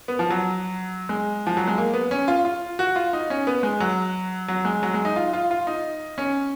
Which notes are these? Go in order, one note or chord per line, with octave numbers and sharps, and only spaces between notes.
B3
F3
F#3
G#3
F3
F#3
G#3
A#3
B3
C#4
F4
F4
F#4
F4
D#4
C#4
B3
G#3
F#3
F#3
G#3
F#3
G#3
D#4
F4
F4
F4
D#4
C#4